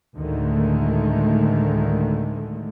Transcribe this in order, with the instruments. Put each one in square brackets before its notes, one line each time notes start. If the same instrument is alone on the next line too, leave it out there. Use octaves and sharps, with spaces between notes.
[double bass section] D2 A2 D3 D#3 G#3 A3